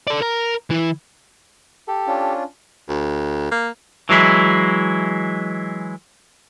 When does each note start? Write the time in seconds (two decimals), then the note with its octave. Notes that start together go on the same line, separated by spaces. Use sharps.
0.07 A4 D5
0.22 A#4 A#5
0.70 E3 E4
1.88 G4 A4
2.07 C#4 D4 F4
2.88 D2
3.51 A#3
4.09 E3 F#3 G#3 E4